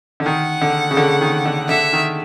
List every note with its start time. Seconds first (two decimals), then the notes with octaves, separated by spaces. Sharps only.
0.20 D3
0.25 D#3 F#5
0.61 D3
0.91 C#3
0.97 D3
1.21 D#3
1.45 D3
1.69 D3 E5
1.93 D#3